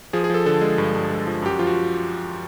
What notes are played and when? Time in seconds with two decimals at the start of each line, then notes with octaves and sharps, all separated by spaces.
0.13 F3 G#4
0.24 G#4
0.30 F3 A4
0.46 D3 A4
0.61 G#3
0.78 G2
0.95 G2
1.10 G#3
1.27 F3
1.42 F#2 G4
1.50 F#4
1.59 F3 F4
1.67 F#4